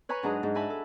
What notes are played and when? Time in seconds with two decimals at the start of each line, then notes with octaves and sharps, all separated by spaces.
0.09 B4 C#5 G#5 A#5 B5 C#6
0.23 G#2 F#3 D4 G#4 A#5 D#6
0.43 G#2
0.55 F#4 E5 G#5 A5 B5
0.70 A4